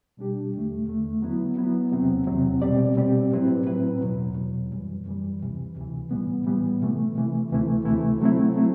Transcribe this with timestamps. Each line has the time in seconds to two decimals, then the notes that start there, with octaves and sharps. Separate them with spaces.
0.17 B2 G3 D4 G4
0.53 E2 D3 A3
0.88 E2 D3 A3
1.22 F#3 B3 E4
1.57 F#3 B3 E4
1.92 E2 C3 F#3 C4
2.27 E2 C3 F#3 C4
2.62 B2 G3 C4 G4 D5
2.97 B2 G3 C4 G4 D5
3.32 A2 F#3 C4 E4 B4
3.66 A2 F#3 C4 E4 B4
4.01 E2 B2 F#3
4.36 E2 B2 F#3
4.72 F#2 E3 G3
5.07 F#2 E3 G3
5.41 D2 C3 E3
5.76 D2 C3 E3
6.11 A2 E3 G3 B3
6.46 A2 E3 G3 B3
6.81 C3 E3 A3
7.15 C3 E3 A3
7.50 D2 C3 E3 A3 E4
7.85 D2 C3 E3 A3 E4
8.21 F#3 A3 C4 E4
8.55 F#3 A3 C4 E4